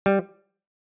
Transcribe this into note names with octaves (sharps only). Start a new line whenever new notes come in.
G3